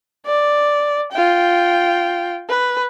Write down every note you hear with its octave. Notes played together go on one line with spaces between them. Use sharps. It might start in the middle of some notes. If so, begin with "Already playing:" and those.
D5
F4 G5
B4